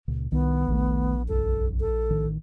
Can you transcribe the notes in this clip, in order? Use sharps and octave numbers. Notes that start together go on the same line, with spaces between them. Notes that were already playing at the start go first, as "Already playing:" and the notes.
C#2 A#2 C#3
C2 D#3 B3
D#1 A#1 D#3 A3
C2 F#2 A4
A4
A1 D#3